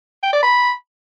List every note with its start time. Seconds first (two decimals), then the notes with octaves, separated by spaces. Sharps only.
0.23 G5
0.33 D5
0.43 B5